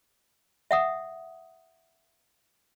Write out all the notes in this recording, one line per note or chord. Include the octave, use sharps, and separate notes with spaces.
E5 F#5 D#6